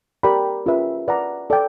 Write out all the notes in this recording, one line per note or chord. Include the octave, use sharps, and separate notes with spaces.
G4 A#4 D5 G5 B5
C#4 F4 G#4 B4 E5
B4 D5 F#5 A#5
A4 D5 G5